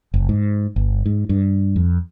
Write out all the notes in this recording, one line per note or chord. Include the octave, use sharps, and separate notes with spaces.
F#1
G#2
G1
G#2
G2
F2